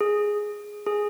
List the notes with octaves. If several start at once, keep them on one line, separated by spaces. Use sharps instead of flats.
G#4
G#4